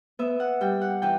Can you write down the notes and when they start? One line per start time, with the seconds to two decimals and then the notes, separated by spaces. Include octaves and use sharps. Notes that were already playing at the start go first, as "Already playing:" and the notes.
0.19 B3 E5
0.40 F#5
0.61 G3 G5
0.81 F#5
1.02 E3 G5